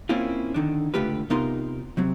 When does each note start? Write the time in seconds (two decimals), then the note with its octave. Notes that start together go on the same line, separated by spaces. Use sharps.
0.09 A#3 C4 C#4 E4 F4
0.54 D3 D#3 D4
0.94 C#2 D3 A3 F4 G4 B4
1.30 C3 B3 D#4 F4 A#4 C6
1.97 C3 F#3 C4